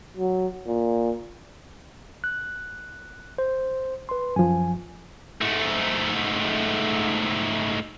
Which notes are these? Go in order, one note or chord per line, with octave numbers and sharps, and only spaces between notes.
F#3
A#2
F#6
C5
B4 C6
F#2 F3 G#5
G#2 A3